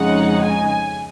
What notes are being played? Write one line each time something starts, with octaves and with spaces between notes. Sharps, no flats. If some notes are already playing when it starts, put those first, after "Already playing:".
Already playing: F2 C#3 G#3 D#4 F#5
G#5